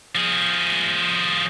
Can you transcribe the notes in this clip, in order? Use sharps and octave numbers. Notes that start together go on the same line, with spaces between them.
F3 G#4